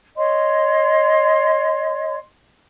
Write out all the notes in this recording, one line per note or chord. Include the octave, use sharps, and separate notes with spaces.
C#5 D#5 C6